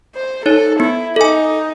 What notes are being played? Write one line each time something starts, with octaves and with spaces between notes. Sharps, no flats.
C5
D#4 A4 C#5
B3 E4
D#4 A4 G#5